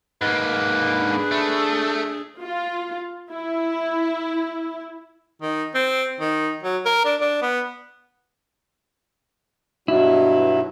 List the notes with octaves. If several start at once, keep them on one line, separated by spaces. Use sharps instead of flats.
G#2 A#3 B4
D4 G#4
A3
F4
E4
D#3
C4
D#3
F#3
A#4
D4
D4
B3
G2 B2 F#3 E4